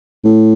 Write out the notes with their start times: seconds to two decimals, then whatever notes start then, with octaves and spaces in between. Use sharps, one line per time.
0.24 A2